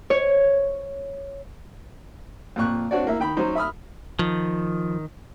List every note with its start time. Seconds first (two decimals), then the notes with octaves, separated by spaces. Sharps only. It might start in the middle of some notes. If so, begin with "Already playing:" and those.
0.10 C#5
2.56 F2 A#2 C#6 F#6
2.91 C4 D4 F#4 C#5 D5
3.05 E3 A#3 E5
3.20 D#3 G5 B5
3.37 F#3 C#4 D#4 C5
3.55 E5 B5 D#6 F6
4.19 D#3 F3